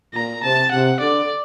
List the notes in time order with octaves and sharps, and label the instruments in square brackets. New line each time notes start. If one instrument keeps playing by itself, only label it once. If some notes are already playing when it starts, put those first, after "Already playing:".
[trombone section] A#2 [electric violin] A#5
[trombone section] C3 [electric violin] A5
[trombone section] C3 [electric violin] F#5
[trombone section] D3 [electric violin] D5